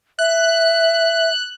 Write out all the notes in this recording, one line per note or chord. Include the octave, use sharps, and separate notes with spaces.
E5 F#6